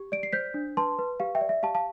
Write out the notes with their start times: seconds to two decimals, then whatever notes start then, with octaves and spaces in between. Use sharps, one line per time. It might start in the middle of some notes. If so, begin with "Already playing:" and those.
Already playing: G4
0.12 D5 D7
0.23 C7
0.33 C5 G6 B6
0.54 D4
0.77 B4 A5 C6
0.99 B4
1.20 G4 F5
1.35 E5 G5
1.41 D5
1.49 E5
1.63 G4 F5 A5
1.75 F5 A5